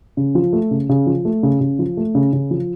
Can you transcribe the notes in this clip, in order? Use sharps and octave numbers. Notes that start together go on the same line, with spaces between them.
C#3
F3
A3
C#3
C#3
F3
A3
C#3
C#3
F3
A3
C#3
C#3
F3